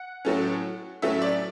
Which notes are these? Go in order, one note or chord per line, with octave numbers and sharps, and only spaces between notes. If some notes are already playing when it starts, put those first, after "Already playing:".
Already playing: F#5
A2 F#3 A3 C#4
A2 F#3 A3 C#4 E5
D5